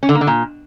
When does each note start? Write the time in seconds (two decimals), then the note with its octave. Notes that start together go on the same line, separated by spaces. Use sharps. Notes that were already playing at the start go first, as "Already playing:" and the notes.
0.03 C#4
0.09 D3
0.15 A#3
0.21 D3
0.27 A#2